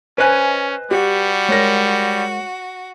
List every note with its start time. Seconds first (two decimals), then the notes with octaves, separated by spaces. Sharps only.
0.18 C#4 B4 C5 D#5 G#5 F#6
0.91 G3 F#4 G4
1.49 G#3 A#4 C#5 A#6